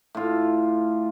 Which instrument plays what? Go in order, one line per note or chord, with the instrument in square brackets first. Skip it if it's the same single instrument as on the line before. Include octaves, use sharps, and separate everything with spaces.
[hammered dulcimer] A2 F4